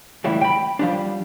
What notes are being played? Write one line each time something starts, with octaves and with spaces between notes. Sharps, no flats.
C#2 A2 E3 G3 E4
G5 B5
F3 G3 D4